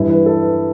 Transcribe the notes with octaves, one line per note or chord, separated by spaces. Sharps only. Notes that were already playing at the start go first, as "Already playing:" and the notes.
Already playing: G2 E3 E4
B4
A4
B4